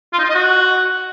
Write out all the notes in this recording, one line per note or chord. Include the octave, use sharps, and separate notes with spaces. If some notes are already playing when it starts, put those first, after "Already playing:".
F4
D#4
F4
D#5
F#4